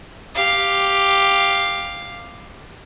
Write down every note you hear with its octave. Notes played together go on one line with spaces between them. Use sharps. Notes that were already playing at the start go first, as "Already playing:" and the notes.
G4 F5